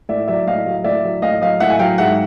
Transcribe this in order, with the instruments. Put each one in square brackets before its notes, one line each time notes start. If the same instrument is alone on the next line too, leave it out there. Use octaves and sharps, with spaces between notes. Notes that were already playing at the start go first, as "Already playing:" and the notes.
[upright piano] A2 D5 E5
F#3 D5 E5
A2 D#5 F5
F#3
A2 D5 E5
F#3
A2 D#5 F5
F#3 D#5 F5
A2 E5 F#5
G#5
F#3 F5 G5
G#2 E5 F#5